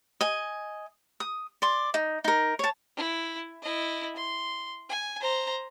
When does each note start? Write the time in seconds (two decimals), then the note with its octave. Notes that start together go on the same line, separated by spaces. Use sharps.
0.21 D#5 G#5
1.20 D#6
1.62 D5 C6
1.94 D#4
2.24 D#4 A#4
2.59 C#5 A5
2.97 E4
3.62 E4 D#5
4.16 C6
4.89 G#5
5.20 C5 A#5